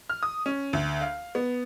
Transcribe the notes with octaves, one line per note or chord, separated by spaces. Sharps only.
F6
D#6
C#4
D2
F5
B3